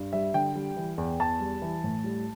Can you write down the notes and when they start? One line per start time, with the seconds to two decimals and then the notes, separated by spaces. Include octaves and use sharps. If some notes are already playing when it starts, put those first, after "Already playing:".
Already playing: G2
0.13 G3 E5
0.34 D3 G5
0.55 G3
0.77 E3
0.98 E2
1.20 E2 A5
1.40 G3
1.62 E3
1.84 A2
2.04 G3